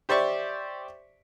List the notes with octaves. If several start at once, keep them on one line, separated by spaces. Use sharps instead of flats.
G4 C5 D5 E5 C#6